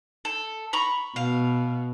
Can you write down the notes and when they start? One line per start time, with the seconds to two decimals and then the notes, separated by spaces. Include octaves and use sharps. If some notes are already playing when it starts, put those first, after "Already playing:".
0.25 A4
0.73 A#5 B5 C#6
1.16 B2 F5